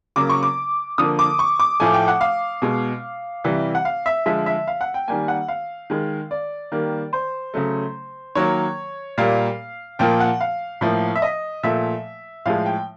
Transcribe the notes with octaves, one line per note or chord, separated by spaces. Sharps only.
C#3 F#3 A#3 D6
C#6
D6
D3 F3 A#3 D#6
D6
C#6
D6
A2 F3 A3 G#5
G5
F#5
F5
B2 G#3
C3 E3 G3
F#5
F5
E5
D3 F3 G#3 E5
E5
F5
F#5
G5
D#3 G3 A#3 G#5
F#5
F5
D#3 G#3
D5
D#3 G3 A#3
C5
C#3 F#3 A3
D#3 F#3 A#3 C#5
A#2 G3 A#3 F5
A#2 F3 A#3 G5
F#5
F5
A2 F3 A#3
E5
D#5
A#2 F3 A3 E5
A2 F3 G#3 F5
G5